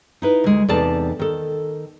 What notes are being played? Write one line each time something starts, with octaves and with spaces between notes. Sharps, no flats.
D#4 E4 B4
D2 G#3
E2 C3 D#4 A4 D5 A5
D#3 A4